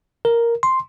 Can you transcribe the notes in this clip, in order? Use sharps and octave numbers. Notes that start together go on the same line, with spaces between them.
A#4
C6